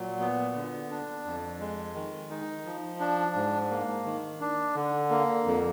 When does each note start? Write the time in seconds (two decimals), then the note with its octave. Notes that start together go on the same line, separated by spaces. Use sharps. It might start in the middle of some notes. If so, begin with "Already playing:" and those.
Already playing: A#2 F#3
0.20 B3
0.55 D3
0.91 D4
1.25 F2
1.60 G#3
1.95 D#3
2.30 D#4
2.65 F3
3.00 D4
3.35 G#2
3.71 A#3
4.05 D#3
4.41 D4
4.75 D3
5.10 A#3
5.46 F2